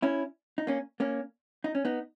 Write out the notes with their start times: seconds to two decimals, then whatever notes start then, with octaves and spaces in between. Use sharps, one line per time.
0.02 C#4 E4
0.58 D#4
0.67 A#3 C#4
1.00 A#3 C#4
1.64 D#4
1.75 C#4
1.85 B3 D#4